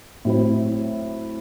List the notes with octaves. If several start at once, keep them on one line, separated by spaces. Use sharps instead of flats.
A2 F#3 C4 E4